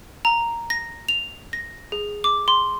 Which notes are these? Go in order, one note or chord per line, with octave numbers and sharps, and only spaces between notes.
A#5
A#6
F7
A#6
G#4
D6
C6